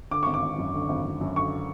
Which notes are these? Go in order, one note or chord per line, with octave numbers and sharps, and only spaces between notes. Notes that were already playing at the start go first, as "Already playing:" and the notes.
D3 D6
G#1 C#6
D6
G#1
F#2
D3
G#1
G#1
F#2
D3 C#6